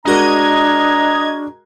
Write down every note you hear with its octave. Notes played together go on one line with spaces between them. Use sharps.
G#3 D4 F#4 A#4 D#5 A#5 G#6